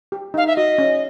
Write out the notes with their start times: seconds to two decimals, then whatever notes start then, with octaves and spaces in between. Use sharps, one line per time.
0.12 G4
0.34 D#4 F5
0.47 E5
0.56 F#4 D#5
0.78 C#4